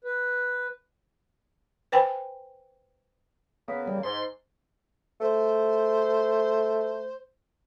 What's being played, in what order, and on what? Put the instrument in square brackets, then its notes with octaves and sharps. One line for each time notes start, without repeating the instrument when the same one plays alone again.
[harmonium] B4
[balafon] B4 C5 G5 G#5 B5
[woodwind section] C#3 A#3 [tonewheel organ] B3
[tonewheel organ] G3
[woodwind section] G#2 [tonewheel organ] C6
[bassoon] A3 [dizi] C5